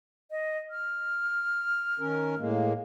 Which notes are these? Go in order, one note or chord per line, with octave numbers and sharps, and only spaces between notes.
D#5
F6
D#3 C#4 A#4
A2 G#3 A#3